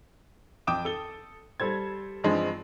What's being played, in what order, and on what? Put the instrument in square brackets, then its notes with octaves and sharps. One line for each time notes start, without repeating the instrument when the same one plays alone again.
[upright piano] F2 G5 D6 D#6 E7
A4 G7
G3 A4 C5 G#6
G2 F3 G#3 C4